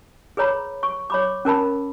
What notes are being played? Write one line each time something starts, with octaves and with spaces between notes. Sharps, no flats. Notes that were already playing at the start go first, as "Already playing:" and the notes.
G#4 B4 C#5 A#5 B5
C#6
C#5 B5 D6
C#4 A#4 A5 B5